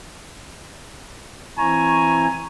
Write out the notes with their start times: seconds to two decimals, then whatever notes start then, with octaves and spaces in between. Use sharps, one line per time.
1.58 E3 C4 E4 G#5 A#5 C#6